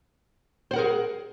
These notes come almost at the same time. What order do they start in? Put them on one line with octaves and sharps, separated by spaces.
C5 F#5 A#4 G#4